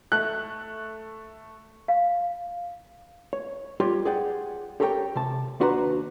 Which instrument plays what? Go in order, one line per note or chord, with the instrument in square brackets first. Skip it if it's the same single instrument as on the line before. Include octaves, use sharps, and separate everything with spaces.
[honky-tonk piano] A3 [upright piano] F#6
[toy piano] F5
[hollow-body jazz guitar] C#5
G3 F4 G4 C#5
G#4 D5 F#5 G5
G4 A4 A#4 C#5 E5 G5
C3 A5
D#2 D4 F#4 B4 C5 A#5